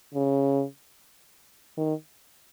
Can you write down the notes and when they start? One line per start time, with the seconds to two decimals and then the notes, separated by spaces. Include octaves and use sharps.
0.15 C#3
1.77 D#3